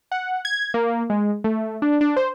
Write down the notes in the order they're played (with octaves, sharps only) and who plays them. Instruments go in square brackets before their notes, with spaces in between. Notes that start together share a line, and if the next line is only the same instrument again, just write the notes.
[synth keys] F#5
G#6
A#3
G#3
A3
D4
D4
C5